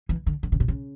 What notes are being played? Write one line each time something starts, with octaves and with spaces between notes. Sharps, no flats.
E3
D3
D3
C#3
B2
C#3